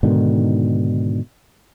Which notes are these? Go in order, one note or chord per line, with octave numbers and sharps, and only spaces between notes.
G#2 B2 D3 D#3